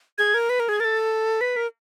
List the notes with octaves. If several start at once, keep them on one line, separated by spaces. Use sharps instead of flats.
G#4 G#6
A#4
B4
A#4
G#4 G#6
A#4 A6
A4
B4 B6
A#4